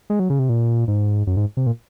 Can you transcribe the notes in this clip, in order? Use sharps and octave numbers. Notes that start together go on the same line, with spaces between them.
G#3
F#3
C#3
C3
A#2
G#2
F#2
G#2
C3
A#2